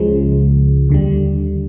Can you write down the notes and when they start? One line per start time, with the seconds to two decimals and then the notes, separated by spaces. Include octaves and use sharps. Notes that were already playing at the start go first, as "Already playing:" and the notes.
Already playing: C#2 C#3 F3 G#3
0.89 D#2 D3 G3